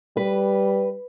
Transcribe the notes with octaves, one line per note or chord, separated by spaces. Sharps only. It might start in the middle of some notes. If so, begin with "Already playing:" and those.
G3 B4